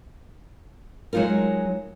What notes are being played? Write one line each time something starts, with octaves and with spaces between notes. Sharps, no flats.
F#3 G#3 D#4 F4 A#4